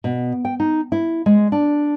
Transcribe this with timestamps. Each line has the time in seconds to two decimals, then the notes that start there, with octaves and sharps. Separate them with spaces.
0.04 B2
0.45 G5
0.60 D#4
0.92 E4
1.26 G#3
1.52 D4